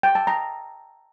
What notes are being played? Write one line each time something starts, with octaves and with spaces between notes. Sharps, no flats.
G5
A5
A#5